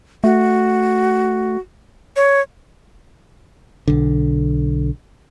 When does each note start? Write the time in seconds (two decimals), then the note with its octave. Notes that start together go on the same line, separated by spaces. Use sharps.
0.24 A3 F#4
2.16 C#5
3.88 B1 D3